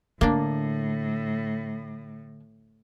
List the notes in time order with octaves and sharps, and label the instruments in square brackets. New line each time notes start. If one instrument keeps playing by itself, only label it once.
[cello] A2 [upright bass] D3 [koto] A#3 D4